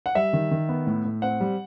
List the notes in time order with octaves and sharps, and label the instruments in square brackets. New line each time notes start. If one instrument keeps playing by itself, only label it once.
[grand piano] F#5
G3 E5
D#3
D#3
B3
A2
A2
C4 F#5
G3